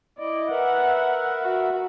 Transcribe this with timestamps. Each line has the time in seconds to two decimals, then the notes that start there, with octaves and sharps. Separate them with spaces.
0.19 E4 D5 D#5
0.50 A#4 B4 E5 F#5
1.42 F#4